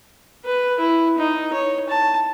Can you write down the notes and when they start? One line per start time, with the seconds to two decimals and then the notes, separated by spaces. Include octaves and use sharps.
0.45 B4
0.79 E4
1.18 D#4
1.53 C#5
1.89 A5